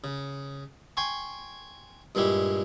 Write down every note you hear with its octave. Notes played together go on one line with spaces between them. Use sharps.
C#3
G5 G#5 C6 C#6
G2 A#2 G#3 E4 G4